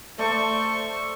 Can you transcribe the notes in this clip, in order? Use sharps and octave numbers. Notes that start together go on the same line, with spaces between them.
A3 C5 D5 C#6